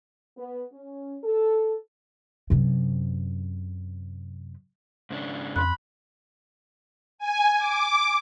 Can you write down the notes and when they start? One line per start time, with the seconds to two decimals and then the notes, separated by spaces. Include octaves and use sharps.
0.38 B3
0.72 C#4
1.23 A4
2.50 F#2 C3
5.10 G#2 C#3 D4
5.56 F2 B5 C6 F#6
7.18 G#5
7.58 D6